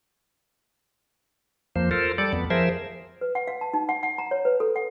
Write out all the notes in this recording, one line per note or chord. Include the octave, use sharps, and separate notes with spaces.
F2 F3 A#3 C5
F4 A4 A#4 C5
G3 A4 D5
F2 B3
F3 G#4 A#4 C5 E5
B4
F#5
F5
A5
D#4
F#5
F#5
A#5
C#5
B4
A4
F#5